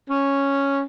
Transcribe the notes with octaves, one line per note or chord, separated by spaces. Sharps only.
C#4